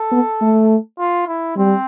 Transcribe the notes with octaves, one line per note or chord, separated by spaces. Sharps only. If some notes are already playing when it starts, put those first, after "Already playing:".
Already playing: A4
B3
A3
F4
E4
G3 C4